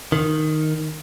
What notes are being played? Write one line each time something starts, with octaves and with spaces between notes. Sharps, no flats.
D#3